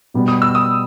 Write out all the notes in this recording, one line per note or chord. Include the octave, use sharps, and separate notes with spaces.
B2 G3 B3
D#6
E6
D#6